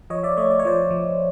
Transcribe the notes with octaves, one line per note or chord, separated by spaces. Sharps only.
F3 C#5 D#5
D5 E5
A3 C#5 D#5
D5
C#5
F3 C5 D5
F3